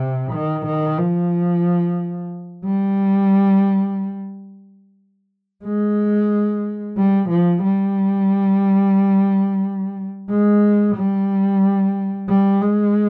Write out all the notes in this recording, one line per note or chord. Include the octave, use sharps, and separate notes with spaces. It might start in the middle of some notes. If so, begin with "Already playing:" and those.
Already playing: C3
D#3
D#3
F3
G3
G#3
G3
F3
G3
G#3
G3
G3
G#3